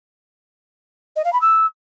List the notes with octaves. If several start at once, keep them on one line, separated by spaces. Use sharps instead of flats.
D#5
F5
B5
E6